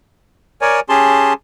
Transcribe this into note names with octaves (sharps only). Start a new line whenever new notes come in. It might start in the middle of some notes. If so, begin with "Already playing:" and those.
A#4 C#5 D5 G#5
C#4 G4 G#4 A5 C6